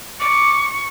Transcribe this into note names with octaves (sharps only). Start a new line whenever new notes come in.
C#6 D6